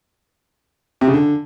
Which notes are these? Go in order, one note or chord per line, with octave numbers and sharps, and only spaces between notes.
C3
C#3
D3